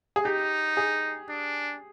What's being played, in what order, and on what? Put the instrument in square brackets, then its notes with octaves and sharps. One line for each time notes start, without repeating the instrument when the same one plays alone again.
[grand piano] G#4
[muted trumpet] D#4 [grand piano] G4
[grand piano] G#4
[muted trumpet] D4